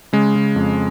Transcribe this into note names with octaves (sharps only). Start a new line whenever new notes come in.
C#3 G#3
C#3
F2